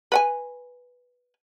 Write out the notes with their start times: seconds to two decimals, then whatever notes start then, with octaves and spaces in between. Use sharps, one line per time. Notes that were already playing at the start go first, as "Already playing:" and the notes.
0.12 B4 F#5 G#5